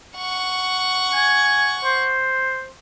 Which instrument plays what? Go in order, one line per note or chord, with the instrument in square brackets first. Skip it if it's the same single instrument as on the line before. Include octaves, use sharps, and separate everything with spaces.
[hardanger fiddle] F#5 C#6
[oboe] G#5
C5